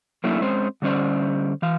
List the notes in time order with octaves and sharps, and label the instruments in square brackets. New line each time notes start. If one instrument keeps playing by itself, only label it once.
[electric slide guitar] F#3 A3 A#3 C#4 D4 E4
G#3 C4 C#4 C5
D3 G3 C#4 C5 D5
E3 F5